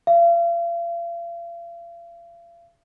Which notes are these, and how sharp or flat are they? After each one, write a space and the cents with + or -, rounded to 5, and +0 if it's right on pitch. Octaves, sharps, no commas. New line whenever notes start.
F5 -40